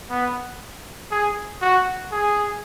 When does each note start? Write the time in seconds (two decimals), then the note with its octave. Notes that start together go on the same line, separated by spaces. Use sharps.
0.10 B3
1.11 G#4
1.62 F#4
2.12 G#4